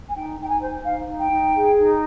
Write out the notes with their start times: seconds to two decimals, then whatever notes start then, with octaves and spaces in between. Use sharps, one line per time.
0.09 G#5
0.14 D#4 G5
0.37 D#4 G5
0.49 G#5
0.61 C5
0.84 D#4 F5
1.07 D#4
1.18 G5
1.30 D#4
1.53 G#4
1.76 D#4